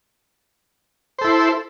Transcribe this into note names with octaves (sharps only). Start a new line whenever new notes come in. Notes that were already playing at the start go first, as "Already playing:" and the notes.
E4 A4 C5